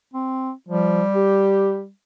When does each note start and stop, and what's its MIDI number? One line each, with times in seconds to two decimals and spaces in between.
0.14 0.52 60
0.69 1.02 53
0.69 1.90 55
1.15 1.82 67